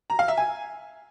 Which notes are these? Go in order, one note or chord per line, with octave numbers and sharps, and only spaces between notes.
A#5
F5
E5
G#5